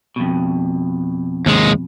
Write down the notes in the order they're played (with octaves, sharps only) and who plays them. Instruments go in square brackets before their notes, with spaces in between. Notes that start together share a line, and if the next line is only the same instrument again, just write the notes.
[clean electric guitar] F2 B2
[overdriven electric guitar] D#2 G#3